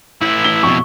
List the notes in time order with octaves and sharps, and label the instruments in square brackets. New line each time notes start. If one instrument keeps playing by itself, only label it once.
[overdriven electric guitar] A2 E3 [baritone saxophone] E4
[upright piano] G7
[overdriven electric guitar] F2 B2 [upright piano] C#6